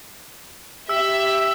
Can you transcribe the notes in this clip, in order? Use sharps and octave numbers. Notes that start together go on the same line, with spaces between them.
G4 E5 E6